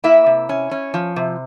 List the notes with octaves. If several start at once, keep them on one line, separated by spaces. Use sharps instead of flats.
A#3 E4 E5
C3
C#4
C#4
F3
C3